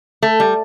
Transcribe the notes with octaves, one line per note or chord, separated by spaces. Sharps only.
A3
G3